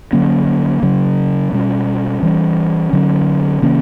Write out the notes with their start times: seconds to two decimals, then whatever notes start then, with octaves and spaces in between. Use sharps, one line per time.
0.13 D3 F#3 A#3 C#4
0.83 C#3 F#3 C#4
1.53 B2 G3 C#4
2.23 E3 G3 C#4
2.93 D3 F#3 C#4
3.62 C#3 E3 A#3 C#4